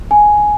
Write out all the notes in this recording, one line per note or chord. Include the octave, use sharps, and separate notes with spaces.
G#5